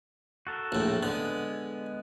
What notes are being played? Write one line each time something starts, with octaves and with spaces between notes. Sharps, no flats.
F#4 A4 A#4
A#1 A2
D3 G#3 B3